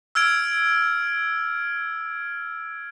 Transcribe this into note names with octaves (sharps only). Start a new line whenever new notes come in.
E6 F6 G#6 D7